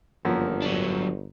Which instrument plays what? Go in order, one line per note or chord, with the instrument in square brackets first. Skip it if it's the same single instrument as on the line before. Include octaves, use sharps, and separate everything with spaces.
[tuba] G1 [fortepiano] F#2 F3 A#3
[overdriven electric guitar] F#3 D4